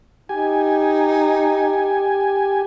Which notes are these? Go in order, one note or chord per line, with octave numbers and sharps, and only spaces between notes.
D#4 G4 G#5